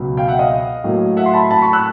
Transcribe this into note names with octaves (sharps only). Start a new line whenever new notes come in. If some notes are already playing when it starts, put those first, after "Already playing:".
Already playing: C#2 B2 F#3 B3
F5 G5
E5 F#5
D#5 F5
A2 F#3 A#3
E5 F#5
C6
A5 B5
A5 B5
B5 C#6
E6 F#6